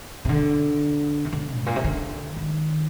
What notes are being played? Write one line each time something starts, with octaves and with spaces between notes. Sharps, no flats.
C3
D3
C3
D3
G#2
A#2
C3
D3
D#3